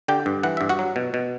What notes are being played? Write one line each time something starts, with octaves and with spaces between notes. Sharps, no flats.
D3 G4 G5
G2
E3 F#5
G2 E5
F#4 F#5
F#3
B2
B2